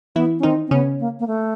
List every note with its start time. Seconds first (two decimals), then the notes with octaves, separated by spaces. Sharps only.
0.16 E3 B3 E4
0.39 C#4
0.43 D#3 C4 D#4
0.67 C4
0.71 C#3 B3 C#4
1.00 A#3
1.19 A#3
1.27 A3